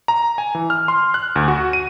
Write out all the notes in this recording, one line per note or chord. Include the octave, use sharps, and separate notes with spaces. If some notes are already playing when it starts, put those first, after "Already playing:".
A#5
G#5
E3
F6
C6
F#6
D2
F#4
D#7